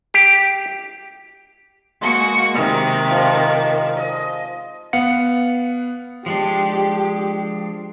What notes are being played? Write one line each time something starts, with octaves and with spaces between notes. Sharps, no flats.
G4
G#3 A#3 F#4 C#6
C3 D#3 D#5
F3 D#5
D#5
B3 F5 F#5 C#7
F3 G#3 D4 G4